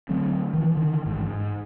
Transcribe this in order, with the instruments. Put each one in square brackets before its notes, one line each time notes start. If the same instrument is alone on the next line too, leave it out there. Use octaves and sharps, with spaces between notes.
[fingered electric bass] D3 F#3 A3 C4
D#3 E3
D3 D#3
A1 G#2
G#2